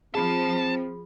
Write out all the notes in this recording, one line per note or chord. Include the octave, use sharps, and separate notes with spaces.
F3 C4 G#4 A5 B5